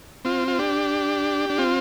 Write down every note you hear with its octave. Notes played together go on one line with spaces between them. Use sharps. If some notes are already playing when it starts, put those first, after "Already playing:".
C4 F4
F4
D4 G4
D4
C4 F4